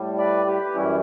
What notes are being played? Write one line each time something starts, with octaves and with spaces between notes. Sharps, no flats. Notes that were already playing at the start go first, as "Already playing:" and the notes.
Already playing: A2 G3
B4 D5
G4 B4
F#2 E3 G3 C#4 E4